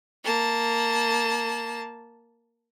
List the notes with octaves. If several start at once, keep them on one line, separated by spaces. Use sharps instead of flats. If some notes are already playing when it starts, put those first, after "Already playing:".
A#3 A5